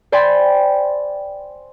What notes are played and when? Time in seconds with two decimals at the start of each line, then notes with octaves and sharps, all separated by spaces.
0.12 C5 D5 G5 G#5 B5 C6